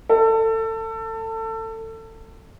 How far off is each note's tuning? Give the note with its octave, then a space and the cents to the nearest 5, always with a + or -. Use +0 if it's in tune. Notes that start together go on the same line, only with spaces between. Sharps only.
A4 +25